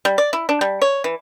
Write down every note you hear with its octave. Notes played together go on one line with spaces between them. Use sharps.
G3
D5
E4
D4
G3
C#5
E3